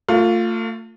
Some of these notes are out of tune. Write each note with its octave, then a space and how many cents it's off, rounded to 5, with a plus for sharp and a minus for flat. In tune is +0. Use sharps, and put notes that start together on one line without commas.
A3 +40 F4 +10